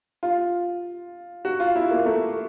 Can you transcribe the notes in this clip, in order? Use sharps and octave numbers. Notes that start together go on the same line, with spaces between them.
F4
F#4
F4
E4
A#3
A3